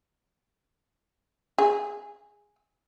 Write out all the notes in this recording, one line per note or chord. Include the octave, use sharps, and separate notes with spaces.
G#4